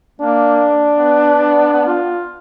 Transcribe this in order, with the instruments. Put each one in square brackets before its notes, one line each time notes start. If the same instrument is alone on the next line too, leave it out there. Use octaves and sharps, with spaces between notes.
[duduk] A#3 [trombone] D4
[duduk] B3
F4